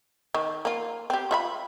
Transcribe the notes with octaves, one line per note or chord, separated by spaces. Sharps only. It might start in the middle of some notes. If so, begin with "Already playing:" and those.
D#3
A#3 F4
C4 G4
F4 E5 B5